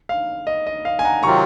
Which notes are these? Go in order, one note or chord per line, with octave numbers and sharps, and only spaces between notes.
F5
D#5
D#5
F5
G#5
F#5 A#5
C3 D#3 F#3 C4 F4 A#5 C#6